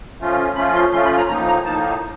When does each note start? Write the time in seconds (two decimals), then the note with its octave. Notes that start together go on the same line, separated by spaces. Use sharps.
0.20 F3 A3 C#4 F4
0.56 F3 A3 C#4 F4 B5
0.75 C6
0.92 F3 A3 C#4 F4 C6
1.05 B5
1.17 A#5
1.28 A2 F3 A#3 D#4 A#5
1.47 A#5
1.65 A2 F3 A#3 D#4 A5